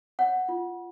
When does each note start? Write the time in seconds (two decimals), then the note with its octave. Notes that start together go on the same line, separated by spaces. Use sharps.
0.19 C#5 F#5
0.49 F4